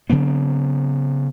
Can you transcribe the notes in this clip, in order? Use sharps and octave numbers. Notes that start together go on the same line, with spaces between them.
C#3 F#3 B3 C4